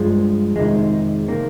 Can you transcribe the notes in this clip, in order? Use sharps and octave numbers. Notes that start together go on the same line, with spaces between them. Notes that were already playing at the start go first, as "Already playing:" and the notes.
Already playing: G2 F3 G#3
F2 C3 D#3 G#3
C3 D#3 A#3